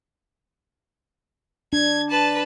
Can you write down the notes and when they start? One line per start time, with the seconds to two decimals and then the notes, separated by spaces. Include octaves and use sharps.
1.73 D4 G#6
2.11 B4 A5